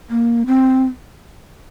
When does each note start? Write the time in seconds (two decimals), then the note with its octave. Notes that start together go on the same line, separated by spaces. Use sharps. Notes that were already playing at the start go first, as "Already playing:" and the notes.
0.10 A#3
0.47 C4